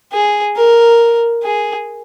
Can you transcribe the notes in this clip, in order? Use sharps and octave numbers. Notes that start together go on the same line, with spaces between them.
G#4
A#4
G#4